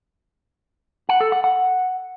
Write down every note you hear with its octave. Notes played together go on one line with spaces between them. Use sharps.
F#5
A4
F#5
F#5